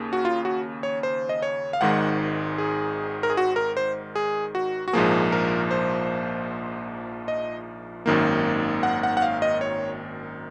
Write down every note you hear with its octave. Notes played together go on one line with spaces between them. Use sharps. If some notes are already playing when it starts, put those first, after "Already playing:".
Already playing: D#2 C#3 A#3
F#4
F4
F#4
C#5
C5
D#5
C#5
F5
G#1 G#2 D#3 G#3 F#5
G#4
A#4
G#4
F#4
A#4
C5
G#4
F#4
F#4
A#1 G#2 F3 A#3 G#4
A#4
C5
D#5
G#1 F#2 D#3 A#3
F#5
F#5
F#5
F5
D#5
C#5